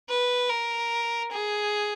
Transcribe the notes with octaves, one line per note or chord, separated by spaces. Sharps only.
B4
A#4
G#4